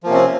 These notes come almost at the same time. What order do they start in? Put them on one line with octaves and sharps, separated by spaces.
F3 A#3 C3 C#4 C4